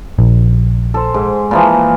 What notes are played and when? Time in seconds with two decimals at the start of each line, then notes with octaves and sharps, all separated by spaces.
0.19 A#1
0.94 A4 C5
1.14 G#2
1.51 A#2 E3 F3